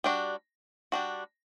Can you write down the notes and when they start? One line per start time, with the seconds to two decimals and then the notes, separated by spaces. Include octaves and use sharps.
0.04 G3 D4 F#4
0.92 G3 D4 F#4